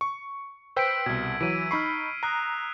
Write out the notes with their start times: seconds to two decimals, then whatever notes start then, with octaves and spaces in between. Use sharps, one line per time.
0.01 C#6
0.76 B4 C5 G5 E6 B6 D7
1.06 C2 B2 G#6
1.41 E3 F#3 D7 D#7
1.71 D#4 B5 C#6 F6 C7
2.23 A#5 D#6 F#6 C7